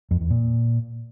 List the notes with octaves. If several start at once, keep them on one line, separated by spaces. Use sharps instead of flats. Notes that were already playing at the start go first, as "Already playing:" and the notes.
F2
E2
A#2